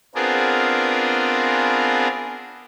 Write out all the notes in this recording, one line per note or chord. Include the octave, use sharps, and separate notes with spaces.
B3 C4 D4 F4 G#4 A#4